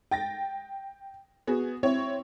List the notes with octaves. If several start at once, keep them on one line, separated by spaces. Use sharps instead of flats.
G5 A6 A#6
B3 F#4 G#4
C4 E4 C#5